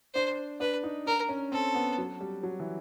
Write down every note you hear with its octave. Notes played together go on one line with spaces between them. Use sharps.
D4 C5
D4 B4
D#4
D4 A#4
C#4
C4 A4
B3
F#3
G3
F#3
E3